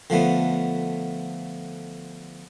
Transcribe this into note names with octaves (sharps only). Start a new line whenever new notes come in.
D3 F3 A3 B3